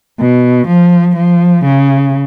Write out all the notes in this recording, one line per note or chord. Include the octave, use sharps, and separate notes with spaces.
B2
F3
F3
C#3